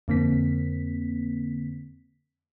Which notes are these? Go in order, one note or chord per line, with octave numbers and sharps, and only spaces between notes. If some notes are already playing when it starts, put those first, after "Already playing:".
F2 D3 A#3 C4 B6